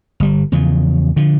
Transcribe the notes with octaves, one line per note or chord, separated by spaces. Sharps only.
G1 G3
E2 C#3 F3
D3 F3